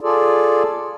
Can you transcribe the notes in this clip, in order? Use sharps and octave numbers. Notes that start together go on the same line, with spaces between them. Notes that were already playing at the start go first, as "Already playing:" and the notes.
F4 G#4 A4 D5